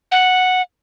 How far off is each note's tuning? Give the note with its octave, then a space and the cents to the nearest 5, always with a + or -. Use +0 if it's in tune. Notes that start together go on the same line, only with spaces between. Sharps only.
F#5 -5